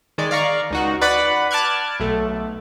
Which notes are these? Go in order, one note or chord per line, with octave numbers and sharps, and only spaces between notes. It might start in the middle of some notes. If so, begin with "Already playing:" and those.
D#3 G#3 D5
D5 F5 A#5 C#6
C#2 D#4 F#4
B4 D5 F#5 B5
A5 D6 F6 F#6 G#6
B1 A3